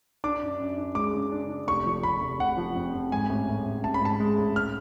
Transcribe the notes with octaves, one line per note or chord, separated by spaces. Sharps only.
D4 D6
F#2
F#2
D4
G#3 D6
C#3
D4
D4
F1 C#6
F3
F1 B5
F1
F1 F#5
F3
F2
F2
G#2 G#5
A1
A1
A1
A1 A5
B5
G#2 A5
G#3
A1
F6